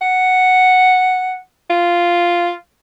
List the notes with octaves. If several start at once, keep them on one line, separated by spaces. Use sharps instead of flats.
F#5
F4